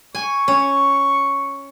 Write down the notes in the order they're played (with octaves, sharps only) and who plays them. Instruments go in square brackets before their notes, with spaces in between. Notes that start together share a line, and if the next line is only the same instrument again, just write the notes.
[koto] G#5 [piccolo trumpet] C#6
[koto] C#4